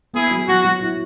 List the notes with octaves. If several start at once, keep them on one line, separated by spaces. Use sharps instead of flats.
B3 E4 G#4
F#3
F#3 F#4
F#3
E4